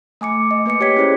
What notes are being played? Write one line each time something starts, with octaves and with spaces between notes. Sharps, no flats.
A3 G#5 D6 C#7
D#5
A#3 B4 D6 C#7
G4 C#5 G5 G#6 B6
C#4 E4 G#4 C5 D5